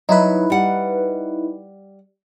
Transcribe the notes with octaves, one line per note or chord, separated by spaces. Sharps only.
F#3 D#4 E4 B4
G3 F#5